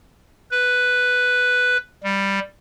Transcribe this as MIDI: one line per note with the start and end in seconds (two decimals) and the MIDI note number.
0.51 1.77 71
2.04 2.40 55